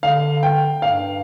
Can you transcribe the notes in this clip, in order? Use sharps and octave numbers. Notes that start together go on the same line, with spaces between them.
D3 F5
G5
G2 F5